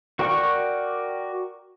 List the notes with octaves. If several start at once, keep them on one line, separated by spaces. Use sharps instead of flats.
F#4 A#4 D5 G5 C#6